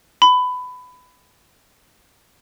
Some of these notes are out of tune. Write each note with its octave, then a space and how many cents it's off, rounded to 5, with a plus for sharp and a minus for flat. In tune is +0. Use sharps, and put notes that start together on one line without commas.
B5 +20